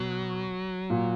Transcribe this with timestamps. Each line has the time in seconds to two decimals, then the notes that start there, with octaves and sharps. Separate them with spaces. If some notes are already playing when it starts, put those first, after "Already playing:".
Already playing: B2 F#3
0.90 A#2